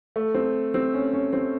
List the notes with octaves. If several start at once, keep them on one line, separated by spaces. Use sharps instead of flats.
A3
C4
C4
C#4
C#4
C4